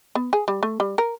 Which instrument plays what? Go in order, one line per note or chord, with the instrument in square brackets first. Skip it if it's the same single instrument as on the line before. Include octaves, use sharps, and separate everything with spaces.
[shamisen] B3
G#4
G3
A3
G3
A#4